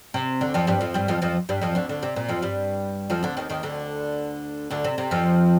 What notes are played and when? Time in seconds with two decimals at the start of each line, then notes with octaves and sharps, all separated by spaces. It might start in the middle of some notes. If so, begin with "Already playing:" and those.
0.14 C3
0.41 D2 D3
0.54 F2 F3
0.67 G2 G3
0.81 F2 F3
0.94 G2 G3
1.08 F2 F3
1.22 F2 F3
1.49 G2 G3
1.61 F2 F3
1.75 D2 D3
1.89 D2 D3
2.02 C3
2.16 A#2
2.28 F2 F3
2.42 G2 G3
3.10 F2 F3
3.23 D2 D3
3.37 D#2 D#3
3.50 D#2 D#3
3.63 D2 D3
4.70 D2 D3
4.84 C3
4.98 C3
5.11 F2 F3